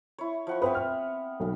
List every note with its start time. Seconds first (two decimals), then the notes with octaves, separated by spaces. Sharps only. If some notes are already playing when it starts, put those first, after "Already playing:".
0.18 E4 C#5
0.47 F3 F#5 C#6
0.62 B3 C4 B4 E5
0.75 F6
1.40 B1